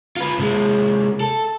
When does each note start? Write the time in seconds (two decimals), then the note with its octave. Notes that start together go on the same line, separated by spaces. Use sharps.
0.16 F4 B4
0.39 C3 G#3
1.21 A4